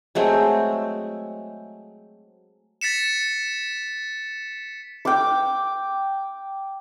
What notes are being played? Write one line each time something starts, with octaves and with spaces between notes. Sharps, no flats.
F#3 G#3 A3 C4
A6 B6 C#7 E7
G5 D6